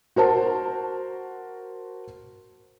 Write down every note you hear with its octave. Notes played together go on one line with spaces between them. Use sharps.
F#4 A#4 C5 A5